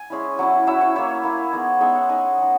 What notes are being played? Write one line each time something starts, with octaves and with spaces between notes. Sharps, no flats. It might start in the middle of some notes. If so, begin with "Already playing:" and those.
Already playing: G#5
G#3 C#4 E4
F#3 C#4 E4
F#3 C#4 E4 E5
C#5
A#3 E4 C#5
A#3 E4
G#3 B3 D#4
G#3 B3 D#4 E5
F#5
G#3 D#4 G#5
G#3 D#4